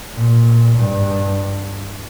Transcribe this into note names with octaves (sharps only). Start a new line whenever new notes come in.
A#2
G2